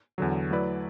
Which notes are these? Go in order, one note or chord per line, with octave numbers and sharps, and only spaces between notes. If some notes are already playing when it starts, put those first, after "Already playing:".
E2 D3 F#3
F#3 A3 E4 B4 D5